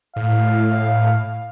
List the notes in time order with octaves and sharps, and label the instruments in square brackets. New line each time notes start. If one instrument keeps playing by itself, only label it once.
[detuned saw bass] A2 [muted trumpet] F5